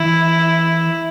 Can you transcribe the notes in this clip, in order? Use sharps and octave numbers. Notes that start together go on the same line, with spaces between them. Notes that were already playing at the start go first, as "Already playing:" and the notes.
Already playing: E3 E4